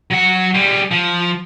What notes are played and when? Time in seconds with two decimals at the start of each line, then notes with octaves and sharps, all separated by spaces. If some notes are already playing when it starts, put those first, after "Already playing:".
0.11 F#3 F#5
0.54 G3 G#4
0.91 F3